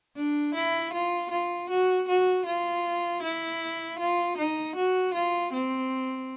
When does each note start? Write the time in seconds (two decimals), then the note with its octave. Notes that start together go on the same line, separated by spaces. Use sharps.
0.16 D4
0.55 E4
0.93 F4
1.31 F4
1.70 F#4
2.08 F#4
2.45 F4
3.22 E4
3.99 F4
4.37 D#4
4.76 F#4
5.14 F4
5.53 C4